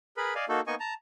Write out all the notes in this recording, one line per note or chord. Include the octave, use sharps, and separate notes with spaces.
G#4 A#4 B4 B5
D5 D#5 F5 G#5
A#3 D#4 F#4 A4
A#3 B3 D#4 D#5 G#5 C#6
A5 A#5